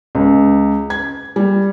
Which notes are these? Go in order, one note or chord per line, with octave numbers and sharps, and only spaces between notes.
C#2
G#6
G3